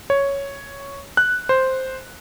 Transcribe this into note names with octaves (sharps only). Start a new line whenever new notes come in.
C#5
F#6
C5